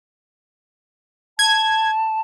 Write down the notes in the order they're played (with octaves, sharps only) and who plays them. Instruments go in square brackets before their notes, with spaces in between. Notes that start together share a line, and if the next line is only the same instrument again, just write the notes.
[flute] A5 [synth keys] G#6